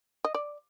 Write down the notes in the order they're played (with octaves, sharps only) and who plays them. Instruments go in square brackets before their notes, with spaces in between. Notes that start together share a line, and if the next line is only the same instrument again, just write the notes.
[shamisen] D#5
D5